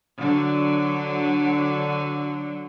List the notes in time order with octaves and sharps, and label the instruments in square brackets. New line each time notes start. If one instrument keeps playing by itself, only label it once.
[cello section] D3 F#3